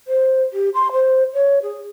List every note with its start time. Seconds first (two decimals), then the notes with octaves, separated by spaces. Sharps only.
0.08 C5
0.53 G4
0.74 C6
0.92 C5
1.34 C#5
1.62 G#4